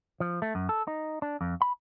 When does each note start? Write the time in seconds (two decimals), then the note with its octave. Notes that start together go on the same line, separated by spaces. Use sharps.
0.20 F3
0.42 A3
0.55 F#2
0.69 A4
0.87 D#4
1.22 D4
1.41 F2
1.62 B5